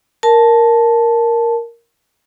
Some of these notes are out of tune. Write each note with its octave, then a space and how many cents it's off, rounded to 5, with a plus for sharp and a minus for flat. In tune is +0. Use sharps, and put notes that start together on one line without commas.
A#4 +0 A5 -10